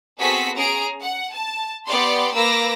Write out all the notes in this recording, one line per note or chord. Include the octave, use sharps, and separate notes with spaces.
B3 C4 F#4 G#4 A4 B6
C#4 G#4 A#5 D7
F#5
A5
B3 G4 D5 C6
A#3 B4 D6 E6 A#6